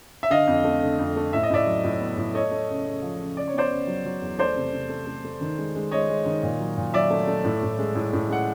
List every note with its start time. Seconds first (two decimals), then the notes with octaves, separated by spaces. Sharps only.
0.23 E5
0.30 D3 D#5 F5
0.47 F2
0.64 A3
0.82 D3
0.99 F2
1.16 A3
1.33 A2 E5
1.43 D#5
1.50 A2 D5 E5
1.67 F#3
1.84 A2
2.00 B3
2.18 A2
2.34 A3 C#5 D#5
2.51 A3
2.69 C#3
2.86 C#3
3.03 F3
3.19 C#3
3.37 C#3 D5
3.47 C#5
3.54 B3 C5 D5
3.71 C#3
3.87 F#3
4.06 F#3
4.22 E2
4.39 A3 C5 D5
4.56 C3
4.72 C3
4.89 A3
5.07 A3
5.24 A3
5.41 D#3
5.58 G#3
5.75 G#3
5.91 G#3 C#5 D#5
6.09 G#3
6.26 D#3
6.43 A#2
6.60 F#3
6.78 A#2
6.94 F#3 D5 E5
7.10 A3
7.27 A3
7.44 A2
7.62 A2
7.79 G#3
7.95 A2
8.13 A2
8.29 G#3 F#5